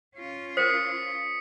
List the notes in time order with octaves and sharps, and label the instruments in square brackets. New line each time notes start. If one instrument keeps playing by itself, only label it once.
[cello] C#4 F4
[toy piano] A#4 C5 [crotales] D#6 B6 C#7